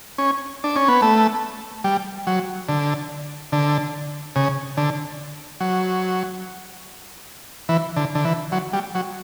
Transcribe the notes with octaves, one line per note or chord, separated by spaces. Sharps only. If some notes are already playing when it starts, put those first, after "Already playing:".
C#4
D4
C#4
B3
A3
G3
F#3
D3
D3
C#3
D3
F#3
E3
D3
D3
E3
F#3
G3
F#3